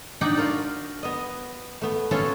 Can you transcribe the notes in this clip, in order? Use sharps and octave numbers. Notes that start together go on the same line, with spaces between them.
D4 D#4 D5 F#5 G5
F4 F#4 A#4 D5
B3 D#5
A3 B3
A3 B3 C#4 F4 F#4 A4